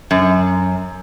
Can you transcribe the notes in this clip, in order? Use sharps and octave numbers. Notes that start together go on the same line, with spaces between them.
F#2